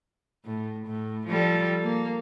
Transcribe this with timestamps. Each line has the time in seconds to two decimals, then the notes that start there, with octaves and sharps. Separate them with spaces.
0.45 A2
0.86 A2
1.27 F3 G3 A4
1.83 A#3